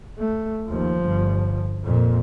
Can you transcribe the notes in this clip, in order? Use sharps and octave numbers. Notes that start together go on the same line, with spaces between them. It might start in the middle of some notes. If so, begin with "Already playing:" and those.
A3
D#2 F3
G1
F2 A#2